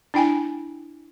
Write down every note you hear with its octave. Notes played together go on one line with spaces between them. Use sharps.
D4 E4 G5 G#5